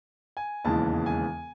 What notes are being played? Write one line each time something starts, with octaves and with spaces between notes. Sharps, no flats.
G#5
E1 D#2 C#3 E3 G#3 A5
G#5